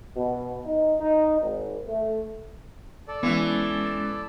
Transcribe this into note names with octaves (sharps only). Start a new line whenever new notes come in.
B2
D#4
D#4
G#1
A3
A4 D5
E3 G#3 B3 C#4